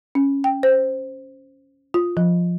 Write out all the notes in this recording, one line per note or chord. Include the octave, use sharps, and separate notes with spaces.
C#4
G5
C5
F4
F3